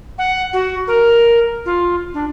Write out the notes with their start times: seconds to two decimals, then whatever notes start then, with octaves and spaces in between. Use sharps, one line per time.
0.18 F#5
0.53 F#4
0.87 A#4
1.65 F4
2.14 D4